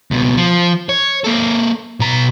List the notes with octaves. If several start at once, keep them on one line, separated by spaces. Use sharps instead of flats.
C#2 B2
F3
C#5
A#3 A4
B2 A#5